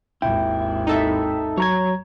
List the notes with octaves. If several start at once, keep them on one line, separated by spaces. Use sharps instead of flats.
G#1 D#2 E4 G5
D#4 A4 E5
F#3 C#5 A#5 G#6